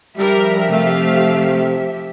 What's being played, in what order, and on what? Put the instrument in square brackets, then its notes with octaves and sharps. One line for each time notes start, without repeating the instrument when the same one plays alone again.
[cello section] F3 G4 E5 [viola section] G3 D4 A#4
[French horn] C3 [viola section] A3 F5